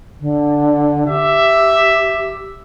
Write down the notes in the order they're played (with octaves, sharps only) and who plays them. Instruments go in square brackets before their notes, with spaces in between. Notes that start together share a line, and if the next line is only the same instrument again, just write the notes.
[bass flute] D3
[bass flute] G4 [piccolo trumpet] E5